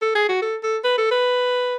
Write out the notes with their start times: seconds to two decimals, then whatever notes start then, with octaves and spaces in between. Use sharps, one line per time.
0.02 A4
0.15 G#4
0.29 F#4
0.42 A4
0.63 A4
0.84 B4
0.98 A4
1.11 B4